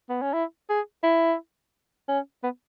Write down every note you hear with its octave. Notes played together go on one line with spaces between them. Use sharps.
B3
C#4
E4
G#4
E4
C#4
B3